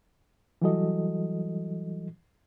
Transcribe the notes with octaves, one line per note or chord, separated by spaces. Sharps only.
E3 F#3 G3 F#4 A4 D#5